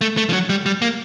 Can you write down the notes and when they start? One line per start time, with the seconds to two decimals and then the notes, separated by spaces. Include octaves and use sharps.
0.01 A3
0.17 A3
0.29 F3
0.33 F#3
0.49 G3
0.66 G3
0.82 A#3